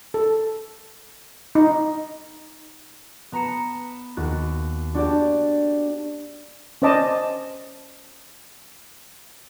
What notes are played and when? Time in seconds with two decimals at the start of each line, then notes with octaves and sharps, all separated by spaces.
0.14 A4
1.55 D#4
3.32 B3 A#5 B5 C#7 E7
4.17 D#2 F#4 F#6 A6
4.94 D4 F#4 G4 D5
6.82 C#4 C5 D5 D#5 A5